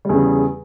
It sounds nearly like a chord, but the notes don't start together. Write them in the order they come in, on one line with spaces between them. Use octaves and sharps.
G3 E2 C#3